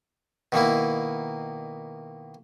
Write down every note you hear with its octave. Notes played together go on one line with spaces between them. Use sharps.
B2 D#3 A#3 E4